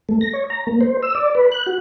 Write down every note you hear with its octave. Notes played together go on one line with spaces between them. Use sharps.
A3
A#6
C#5
A#5
A#3
C5
E6
D5
B4
F#6
F#4